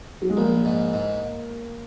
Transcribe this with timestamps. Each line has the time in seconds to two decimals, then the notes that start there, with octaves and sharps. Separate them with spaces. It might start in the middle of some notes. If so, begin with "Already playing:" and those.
0.22 F#3
0.30 G#3
0.37 A#1 A#3
0.65 G#2
0.93 G#2